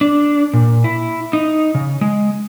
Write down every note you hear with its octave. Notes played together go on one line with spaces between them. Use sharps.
D4
A#2
E4
D#4
C#3
G#3